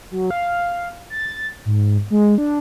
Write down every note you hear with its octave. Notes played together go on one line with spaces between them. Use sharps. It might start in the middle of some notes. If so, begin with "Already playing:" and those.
F#3
F5
A6
G#2
G#3
D4